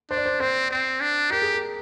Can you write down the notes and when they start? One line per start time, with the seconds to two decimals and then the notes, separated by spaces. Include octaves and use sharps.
0.10 D4 C5
0.17 D5
0.26 C5
0.40 C4 C5
0.71 C4
1.01 D4
1.31 G4 A#4
1.42 G#4
1.53 A#4